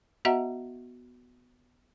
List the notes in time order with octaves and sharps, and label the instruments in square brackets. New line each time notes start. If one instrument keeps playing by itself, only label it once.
[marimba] B3 F#4 D#5 E5 F#5 A#5